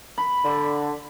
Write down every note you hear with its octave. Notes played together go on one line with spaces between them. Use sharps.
B5
D3